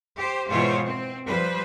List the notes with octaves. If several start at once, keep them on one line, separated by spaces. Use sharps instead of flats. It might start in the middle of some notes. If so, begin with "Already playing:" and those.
G4 C5
G#2 B2 E3 F4 C5 C#5
C4
F3 G3 B4 C5